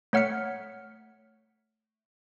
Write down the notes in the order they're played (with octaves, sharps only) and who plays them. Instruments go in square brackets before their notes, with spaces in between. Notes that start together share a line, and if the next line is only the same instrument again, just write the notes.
[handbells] A3 C#5 F#5 F6 B6 C#7